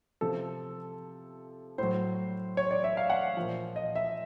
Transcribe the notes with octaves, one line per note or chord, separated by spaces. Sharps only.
C3 F3 A4
A2 F#3 C5
C#5
D5
E5
F5
F#5
A#2 F3
D#5
E5